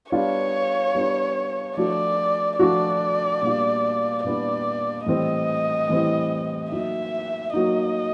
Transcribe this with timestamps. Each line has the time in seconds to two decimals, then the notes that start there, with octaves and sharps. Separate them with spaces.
0.12 G3 B3 D4 F4 C#5
0.95 G3 B3 D4 F4
1.77 F3 A3 D4 F#4 D5
2.59 F3 A3 D4 F#4 D5
3.42 A#2 G3 B3 D4 F4
4.24 A#2 G3 B3 D4 F4 D5
5.06 A2 E3 G3 C4 D#5
5.89 A2 E3 G3 C4
6.71 F#3 A#3 D#4 E5
7.53 F#3 A#3 D#4 D#5